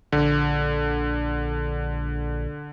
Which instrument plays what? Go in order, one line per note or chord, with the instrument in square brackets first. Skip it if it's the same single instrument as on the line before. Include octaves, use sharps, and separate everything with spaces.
[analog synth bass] A#1 [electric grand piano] D3